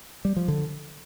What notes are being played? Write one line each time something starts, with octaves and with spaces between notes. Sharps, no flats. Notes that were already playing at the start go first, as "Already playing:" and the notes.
G3
F3
D3